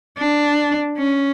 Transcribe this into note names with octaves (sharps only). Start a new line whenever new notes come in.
D4
C#4